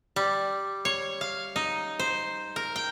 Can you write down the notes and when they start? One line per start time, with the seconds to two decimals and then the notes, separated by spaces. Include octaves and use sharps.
0.16 G3
0.85 C#5
1.21 F5
1.56 D#4
1.99 C5
2.56 A#4
2.76 G5